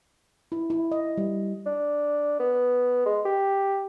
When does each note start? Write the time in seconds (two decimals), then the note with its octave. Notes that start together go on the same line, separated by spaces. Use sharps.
0.52 E4
0.70 E4
0.92 D#5
1.18 G3
1.66 D4
2.39 B3
3.05 G#3
3.25 G4